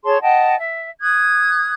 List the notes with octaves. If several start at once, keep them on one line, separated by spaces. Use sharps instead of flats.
G#4 C#5 A5 C6
D#5 F#5 G5 A5
E5
D#6 F#6 G#6